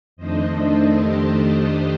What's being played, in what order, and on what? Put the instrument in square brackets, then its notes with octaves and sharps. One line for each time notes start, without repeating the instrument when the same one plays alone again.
[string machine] F2 D#3 A3 D4 C5 D#5
A4
G4